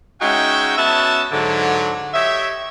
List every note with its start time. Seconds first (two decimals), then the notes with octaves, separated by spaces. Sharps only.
0.22 G#3 C#4 D#4 F#4 E5 G5
0.78 B3 C#4 F#4 E5 A5
1.32 G#2 D3 F#3
2.14 G4 C#5 D#5 E5